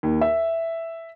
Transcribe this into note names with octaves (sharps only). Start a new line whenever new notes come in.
D#2
E5